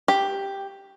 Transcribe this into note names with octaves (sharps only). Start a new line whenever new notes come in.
G4